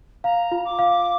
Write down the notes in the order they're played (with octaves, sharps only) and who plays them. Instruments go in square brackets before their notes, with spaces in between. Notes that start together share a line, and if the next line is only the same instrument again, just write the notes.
[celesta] F5 [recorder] A#5
[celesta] F4
[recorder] D6
[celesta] F5